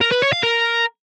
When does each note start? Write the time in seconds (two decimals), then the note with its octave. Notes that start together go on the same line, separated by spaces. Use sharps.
0.01 A#4
0.12 B4
0.22 C#5
0.33 F5
0.43 A#4